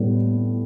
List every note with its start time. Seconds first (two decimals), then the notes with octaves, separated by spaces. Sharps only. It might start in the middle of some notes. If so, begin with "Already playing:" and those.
Already playing: A2 G3 B3